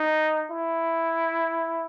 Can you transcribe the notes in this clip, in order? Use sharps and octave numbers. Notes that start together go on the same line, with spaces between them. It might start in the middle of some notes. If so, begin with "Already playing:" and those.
Already playing: D#4
E4